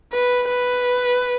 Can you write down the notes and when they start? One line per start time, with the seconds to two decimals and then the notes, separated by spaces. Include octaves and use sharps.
0.13 B4
0.49 B4